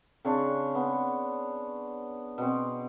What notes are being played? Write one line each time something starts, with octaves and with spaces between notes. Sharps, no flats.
C#3 C4 D4 C#5
B3
B2 C4